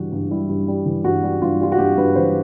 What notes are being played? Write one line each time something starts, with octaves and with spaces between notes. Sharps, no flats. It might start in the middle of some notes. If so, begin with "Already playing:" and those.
Already playing: G2 E3 G3 F#4
G2
G3 E4
G2
G3
E3
G2 F#4
G3
G2 F4
G3 F4
F#4
G2 G4
G2 B4
E3 C5